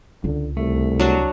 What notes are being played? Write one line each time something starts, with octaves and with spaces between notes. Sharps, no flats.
C#2 D3
C2 A3
F#3 D4 F#4